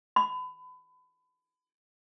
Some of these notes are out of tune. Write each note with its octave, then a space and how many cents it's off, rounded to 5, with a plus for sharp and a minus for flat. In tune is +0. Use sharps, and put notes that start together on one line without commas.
B5 +30